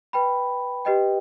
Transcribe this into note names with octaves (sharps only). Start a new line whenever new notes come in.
B4 G5 B5
G4 B4 D#5 G5